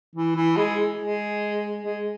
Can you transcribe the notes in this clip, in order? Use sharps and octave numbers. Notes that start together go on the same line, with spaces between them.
E3
E3
G#3
G#3
G#3